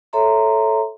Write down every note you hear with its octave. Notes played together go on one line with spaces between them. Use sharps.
A4 C#5 E5 A#5 C6